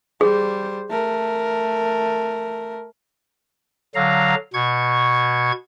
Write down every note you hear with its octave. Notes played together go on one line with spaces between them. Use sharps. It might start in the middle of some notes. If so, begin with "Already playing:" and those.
G3 G#4 C5
A3 A#4
D3 F#3 F5 A#5
B2 C#6 G#6